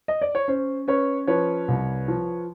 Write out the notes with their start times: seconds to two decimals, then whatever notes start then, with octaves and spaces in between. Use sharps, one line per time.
0.08 D#5
0.22 D5
0.35 C#5
0.48 C#4 C5
0.88 C#4 B4 C#5
1.27 F3 B4 C#5
1.68 C2
2.08 F3